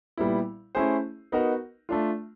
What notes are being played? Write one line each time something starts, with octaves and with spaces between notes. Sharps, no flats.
A#2 G3 B3 E4
A3 C#4 E4 G#4 C5
B3 D#4 F#4 A#4
A3 D4 F4